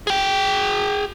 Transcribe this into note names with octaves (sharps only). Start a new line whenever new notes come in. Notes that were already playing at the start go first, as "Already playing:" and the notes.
G#4 G5